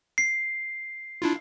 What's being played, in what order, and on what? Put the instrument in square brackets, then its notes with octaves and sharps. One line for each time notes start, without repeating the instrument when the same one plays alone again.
[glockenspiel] C7
[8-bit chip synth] D4 E4 F4